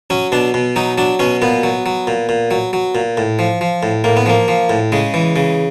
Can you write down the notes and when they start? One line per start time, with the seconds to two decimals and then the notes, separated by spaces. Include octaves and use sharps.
0.10 F#3 C#4
0.32 B2 D4
0.54 B2
0.76 F#3 D#4
0.98 F#3 D4
1.19 B2 C#4
1.42 A#2 B3
1.63 F#3
1.86 F#3
2.07 A#2
2.29 A#2
2.51 F#3
2.73 F#3
2.95 A#2
3.17 A2
3.39 F3
3.61 F3
3.83 A2
4.04 A2 A#3
4.17 B3
4.26 F3 A#3
4.48 F3
4.70 A2
4.92 C#3 G#3
5.14 E3
5.36 C#3